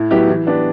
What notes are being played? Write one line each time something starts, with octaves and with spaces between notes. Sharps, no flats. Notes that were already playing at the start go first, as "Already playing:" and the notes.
Already playing: A2
F#3 B3 E4 G4
E3
B3 D4 G4